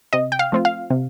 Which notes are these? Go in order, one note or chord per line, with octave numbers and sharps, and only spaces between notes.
C3 D#5
G5
F5
F3 A3 C4 F4
F5
C3